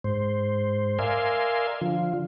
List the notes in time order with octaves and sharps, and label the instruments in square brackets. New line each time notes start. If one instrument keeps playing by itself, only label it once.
[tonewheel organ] G#2 C5
A#4 D5 E5 F5 G#5 C6
D3 F3 F4